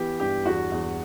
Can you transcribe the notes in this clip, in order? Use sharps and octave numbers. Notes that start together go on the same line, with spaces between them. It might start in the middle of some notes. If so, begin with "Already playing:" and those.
Already playing: E3 B3 G4
G2 G4
E2 F#4
E2